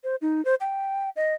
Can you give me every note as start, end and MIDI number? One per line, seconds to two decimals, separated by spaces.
0.04 0.16 72
0.22 0.44 63
0.45 0.55 72
0.61 1.10 79
1.16 1.34 75